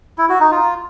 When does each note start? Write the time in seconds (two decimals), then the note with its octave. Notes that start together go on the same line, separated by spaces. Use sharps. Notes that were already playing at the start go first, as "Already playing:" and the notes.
0.18 E4
0.29 F#4
0.40 D#4
0.51 F4